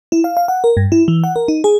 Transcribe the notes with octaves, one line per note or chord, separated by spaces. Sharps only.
E4
F5
F5
F#5
A#4
G2
E4
E3
F#5
A#4
D#4
G#4